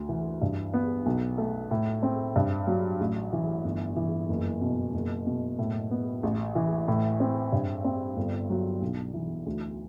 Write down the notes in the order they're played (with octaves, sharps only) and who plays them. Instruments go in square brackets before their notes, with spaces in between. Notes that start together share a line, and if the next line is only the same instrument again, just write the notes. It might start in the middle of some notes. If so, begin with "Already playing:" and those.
Already playing: [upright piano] D2
E3
G2
B3
B1
A3
A2
C4
G2
F#3
A1
E3
G1
E3
F#1
B2
F#1
B2
A2
B3
A1
E3
A2
C4
G2
C4
G1
F#3
B1
E3
D2